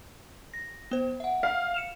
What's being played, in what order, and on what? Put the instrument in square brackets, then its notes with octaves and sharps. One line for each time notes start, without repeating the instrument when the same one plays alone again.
[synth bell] A#6
B3 C5
E5 F#5
[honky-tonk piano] F5
[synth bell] C#7 E7 F7